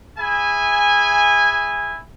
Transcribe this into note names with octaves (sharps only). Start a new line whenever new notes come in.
E4 G#4 E5 G#5